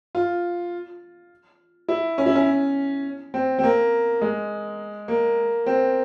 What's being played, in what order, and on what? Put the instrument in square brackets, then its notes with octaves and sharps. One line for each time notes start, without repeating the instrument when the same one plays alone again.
[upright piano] F4
E4
C#4
E4
C#4
C4
C4
A#3
G#3
A#3
C4